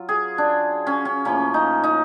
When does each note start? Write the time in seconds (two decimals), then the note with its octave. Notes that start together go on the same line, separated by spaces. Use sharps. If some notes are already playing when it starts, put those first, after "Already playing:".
Already playing: F#3 F4
0.09 G#4
0.38 D4
0.87 C#4
1.05 C#4
1.25 A2 F3 A#3 C#4
1.54 D#4
1.84 D#4